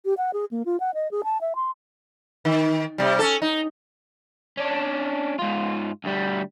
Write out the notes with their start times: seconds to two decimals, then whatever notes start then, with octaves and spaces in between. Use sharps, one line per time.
0.05 G4
0.18 F#5
0.33 G#4
0.51 A#3
0.66 F4
0.80 F#5
0.94 D#5
1.11 G#4
1.24 A5
1.41 E5
1.55 C6
2.45 D#3
2.98 C3 G3
3.19 C#4 A4
3.42 D#4
4.57 C#4 D4
5.39 G#2 F4
6.04 D2 G3